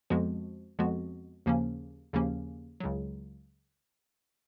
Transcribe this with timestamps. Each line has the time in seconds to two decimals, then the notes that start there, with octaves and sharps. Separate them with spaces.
0.10 F2 F3 G#3 B3 F#4
0.79 F2 F3 G#3 B3 F#4
1.46 D#2 C#3 F3 A#3 C#4
2.13 D#2 C#3 F3 A#3 C#4
2.80 C#2 C#3 F#3